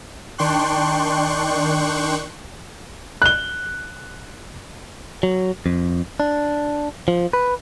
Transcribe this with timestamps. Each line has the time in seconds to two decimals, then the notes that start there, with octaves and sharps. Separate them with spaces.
0.38 D#3 D4 G5 C6 C#6 F#6
3.22 F#6 G7
5.23 F#3
5.66 F2
6.20 D4
7.08 F3
7.33 B4